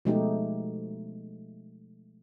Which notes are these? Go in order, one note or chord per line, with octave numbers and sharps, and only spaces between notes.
B2 F3 G#3 A3 D#4 G4